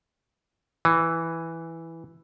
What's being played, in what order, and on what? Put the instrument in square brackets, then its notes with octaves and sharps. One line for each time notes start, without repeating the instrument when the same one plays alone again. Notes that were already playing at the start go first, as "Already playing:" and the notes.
[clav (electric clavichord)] E3